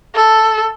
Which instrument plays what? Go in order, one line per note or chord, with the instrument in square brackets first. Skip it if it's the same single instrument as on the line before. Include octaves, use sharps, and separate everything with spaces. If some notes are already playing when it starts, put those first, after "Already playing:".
[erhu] A4